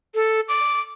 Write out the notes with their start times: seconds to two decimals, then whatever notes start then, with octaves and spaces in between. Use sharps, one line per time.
0.15 A4
0.48 D6